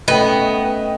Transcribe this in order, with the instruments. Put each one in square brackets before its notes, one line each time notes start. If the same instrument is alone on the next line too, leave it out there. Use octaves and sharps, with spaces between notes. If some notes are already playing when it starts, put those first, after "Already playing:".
[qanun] A3 C#4 [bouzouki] B3 [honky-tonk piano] D#5 G5